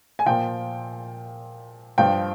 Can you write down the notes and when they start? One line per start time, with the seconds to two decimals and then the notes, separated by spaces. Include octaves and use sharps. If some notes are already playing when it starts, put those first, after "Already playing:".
0.19 G#5
0.26 A#2 F3 G5
1.98 G2 F3 G5